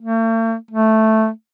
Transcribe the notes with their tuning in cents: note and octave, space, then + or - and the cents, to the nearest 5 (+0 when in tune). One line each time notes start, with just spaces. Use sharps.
A3 +45
A3 +0